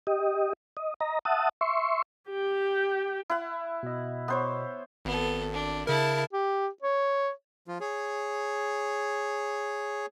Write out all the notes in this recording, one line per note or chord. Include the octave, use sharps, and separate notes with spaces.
G4 D#5
D#5
D#5 A#5
E5 F#5 A5 D#6
E5 C6 C#6
G4 G5
E4 F#5
B2 D#5
B3 C5 C#5
G#1 B3 A4
D4
C#3 E4 A#4 A5
G4
C#5
F3 F4
G#4 C#5